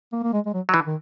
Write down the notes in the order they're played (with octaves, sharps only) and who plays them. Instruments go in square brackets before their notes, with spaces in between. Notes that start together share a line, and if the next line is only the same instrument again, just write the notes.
[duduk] A#3
A#3
G#3
G#3
F#3
[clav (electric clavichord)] F#3
E3
[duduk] D#3